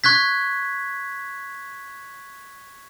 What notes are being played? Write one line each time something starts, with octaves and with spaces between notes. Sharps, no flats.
C#6 F#6 G#6 B6